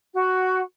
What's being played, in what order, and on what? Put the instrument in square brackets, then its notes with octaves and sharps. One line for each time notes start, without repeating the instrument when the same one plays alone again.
[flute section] F#4